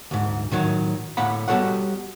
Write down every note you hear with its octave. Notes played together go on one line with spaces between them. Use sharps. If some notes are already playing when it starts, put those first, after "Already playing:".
D2 G#2
A2 D#3 F#3
A2 D3 A#3 F#5 B5
G3 B3 F#4 A4 C#5 F#5